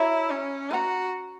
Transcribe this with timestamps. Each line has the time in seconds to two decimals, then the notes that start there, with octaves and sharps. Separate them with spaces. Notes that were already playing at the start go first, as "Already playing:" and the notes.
Already playing: E4 F#4 C#5 E5 A#5
0.30 C#4
0.71 F#4 B4 F#5 A#5